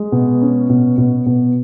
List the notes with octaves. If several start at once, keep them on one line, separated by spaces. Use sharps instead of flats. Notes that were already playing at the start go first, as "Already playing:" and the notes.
Already playing: G#3
B2
C#4
B2
B2
B2